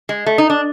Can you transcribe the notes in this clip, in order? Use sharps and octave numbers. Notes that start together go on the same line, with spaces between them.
G#3
A3
D#4
D4